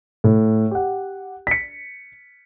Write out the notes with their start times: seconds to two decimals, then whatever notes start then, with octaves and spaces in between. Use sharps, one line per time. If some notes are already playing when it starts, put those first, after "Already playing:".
0.24 A2
0.71 G4 F#5
1.47 B6 C#7